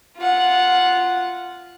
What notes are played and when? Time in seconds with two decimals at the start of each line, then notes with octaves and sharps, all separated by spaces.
0.17 F4 F#5